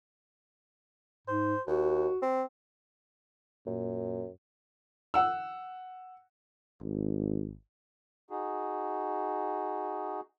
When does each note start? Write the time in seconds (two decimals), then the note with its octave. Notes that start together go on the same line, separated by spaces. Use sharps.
1.28 G#2 C5
1.67 D#2 F#4
2.22 C4
3.67 F#2 A#2
5.14 F#5 E6
6.82 G#1
8.30 D#4 F#4 G#4